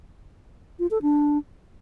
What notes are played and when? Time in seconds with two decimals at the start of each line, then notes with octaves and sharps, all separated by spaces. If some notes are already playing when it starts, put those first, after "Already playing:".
0.79 F4
0.91 A4
1.02 D4